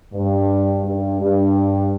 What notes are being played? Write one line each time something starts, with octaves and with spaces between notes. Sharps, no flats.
G2
G2
G2